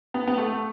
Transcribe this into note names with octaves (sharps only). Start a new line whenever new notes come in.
B3
B3
A3